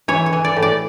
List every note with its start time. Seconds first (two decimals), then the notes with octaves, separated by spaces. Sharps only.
0.08 E3 C#5
0.26 C#5
0.33 E3
0.45 D5
0.56 A2
0.62 D5